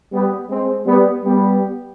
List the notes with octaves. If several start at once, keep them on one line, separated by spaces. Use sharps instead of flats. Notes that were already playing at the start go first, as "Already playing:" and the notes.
G3 B3
G#3 C4
G3 B3
G3 B3